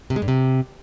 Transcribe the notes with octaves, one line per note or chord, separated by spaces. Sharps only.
C3
G#3
G2
C3